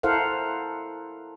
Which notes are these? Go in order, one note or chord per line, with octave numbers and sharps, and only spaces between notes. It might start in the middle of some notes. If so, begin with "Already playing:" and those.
E4 A4 A#4 C5 F5 F#5